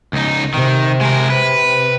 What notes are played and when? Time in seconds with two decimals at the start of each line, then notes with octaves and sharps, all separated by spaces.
0.13 C#2 D#4
0.54 C3 D#3
1.01 G#3 A#4
1.30 B4